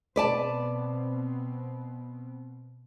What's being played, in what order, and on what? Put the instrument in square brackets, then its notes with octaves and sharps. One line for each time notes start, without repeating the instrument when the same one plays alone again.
[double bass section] B2 B3 C4 [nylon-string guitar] B4 D5 A5